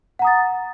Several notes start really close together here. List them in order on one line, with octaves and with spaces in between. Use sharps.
F#5 A#5 D#6 A6